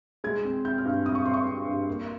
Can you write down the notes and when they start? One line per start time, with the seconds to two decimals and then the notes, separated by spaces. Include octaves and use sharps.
0.24 G#3 G#6
0.45 C4
0.65 C4 G6
0.78 F6
0.85 G2
1.06 C4 D#6
1.15 C#6
1.25 C4 C6
1.34 C#6
1.47 C4
1.67 G2
1.88 A#3